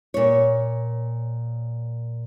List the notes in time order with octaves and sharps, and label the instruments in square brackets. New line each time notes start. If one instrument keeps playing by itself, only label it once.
[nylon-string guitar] A#2 C#5